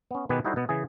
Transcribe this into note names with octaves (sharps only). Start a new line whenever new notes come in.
B3 C#4
B2 D#3 B3 G4 G#4 B4
G3 D#4 E4 F#4 A4 C5
B2 B3
C#3 E3 G#4